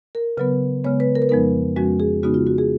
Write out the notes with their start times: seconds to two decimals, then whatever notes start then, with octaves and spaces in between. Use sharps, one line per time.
0.15 A#4
0.37 C#3 F#3 B3 B4
0.84 C#3 G#3 B3 C#5
1.00 B4
1.15 A#4
1.22 B4
1.29 F2 F3 G#3 B3 D#4 A#4
1.76 F2 F3 G#3 C#4 F#4
2.00 G#4
2.23 C#3 G#3 B3 D#4 F#4
2.34 F4
2.47 F#4
2.58 G#4